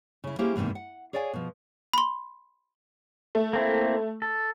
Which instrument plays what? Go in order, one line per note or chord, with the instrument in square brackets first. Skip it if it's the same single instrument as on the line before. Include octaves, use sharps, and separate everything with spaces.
[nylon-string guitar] C#3 E4
A#3 C#4 E4 G4 G#4 C5
E2 G#2 C3 D#3 A#3
F#5
G#4 C#5 D5 F5 G#5
B2 F3
[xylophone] B5 C6
[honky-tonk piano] A3
[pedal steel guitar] A#3 C4 E4
A4